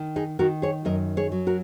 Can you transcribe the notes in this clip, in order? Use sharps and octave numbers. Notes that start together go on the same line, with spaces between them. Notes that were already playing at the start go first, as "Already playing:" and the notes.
Already playing: D#3
D#4 G#4
D#3 F#4 A#4
G#4 C#5
F#2 A#4 D#5
G#4 C#5
F#3
F#4 A#4